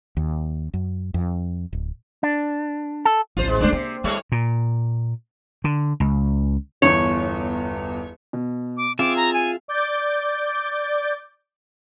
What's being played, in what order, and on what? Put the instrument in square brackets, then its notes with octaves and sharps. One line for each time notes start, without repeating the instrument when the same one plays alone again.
[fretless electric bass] D#2
F#2
F2
D1
[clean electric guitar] D4
A4
[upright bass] A1 D2 [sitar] F4 C5
[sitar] G#3
[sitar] C#3 D4 C5 [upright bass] G#3 A3
[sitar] C3 [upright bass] A#3
[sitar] G3 A3 C#5 [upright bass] E4
[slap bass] A#2
D3
C#2
[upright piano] G1 E2 [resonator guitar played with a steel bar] C#5
[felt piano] B2
[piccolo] D6
[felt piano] C4 [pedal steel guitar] F4 G#4 E5 [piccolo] D6
[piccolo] A#5
G#5
[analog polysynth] D5 D6 G6 A6